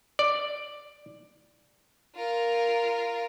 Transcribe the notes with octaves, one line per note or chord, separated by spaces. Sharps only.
D5
F4 A#4